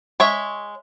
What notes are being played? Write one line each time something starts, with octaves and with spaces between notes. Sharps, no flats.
G#3 C#5 E5